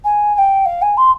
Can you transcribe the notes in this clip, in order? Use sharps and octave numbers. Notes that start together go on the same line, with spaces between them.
G#5
G#5
G5
F5
G#5
C6